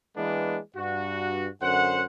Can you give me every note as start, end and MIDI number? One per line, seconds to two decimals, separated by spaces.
0.17 0.58 52
0.17 0.58 56
0.17 0.58 58
0.17 0.58 59
0.17 0.58 62
0.77 1.48 43
0.77 1.48 66
1.62 2.04 42
1.62 2.04 50
1.62 2.04 72
1.62 2.04 78